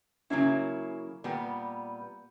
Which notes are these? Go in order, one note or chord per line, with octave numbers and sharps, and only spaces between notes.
C#3 F#3 A#3 C#4 E4
A#2 G3 B3